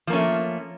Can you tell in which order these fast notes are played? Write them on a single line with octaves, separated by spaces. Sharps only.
F3 A#3 C#4 A3